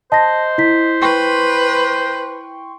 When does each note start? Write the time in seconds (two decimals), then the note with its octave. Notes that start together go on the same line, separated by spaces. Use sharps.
0.12 C5 D#5 A5 A#6
0.58 E4 B6
1.02 B4 G5 C6 C#6